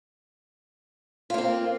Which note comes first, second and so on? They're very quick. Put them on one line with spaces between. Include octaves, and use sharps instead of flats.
F4 A#3 C4